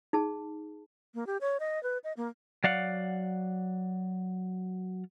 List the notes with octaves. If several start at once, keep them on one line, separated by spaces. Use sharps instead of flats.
D#4 G#4 A5
A#3
G4
C#5
D#5
B4
D#5
A#3
F#3 D5 F5 F#5